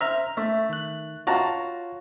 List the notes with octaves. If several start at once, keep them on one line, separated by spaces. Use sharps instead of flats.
C5 E5 A#5 F6
A3 E5
D#3 F#6
F4 F#4 C#5 F5 A5 A#5